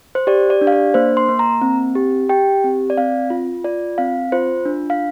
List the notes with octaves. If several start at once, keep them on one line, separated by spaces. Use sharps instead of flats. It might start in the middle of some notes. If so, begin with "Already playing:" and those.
C5
G4 D5
D5
D4
F5
D5
A#3 C5
C6
A#3
A#5
C4
G4
G4 G5
C4
D5
C4 F5
F4
F4 D5
C4 F5
F4 C5
D4
F5